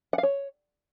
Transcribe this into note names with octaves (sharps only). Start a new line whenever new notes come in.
F#5
F5
C#5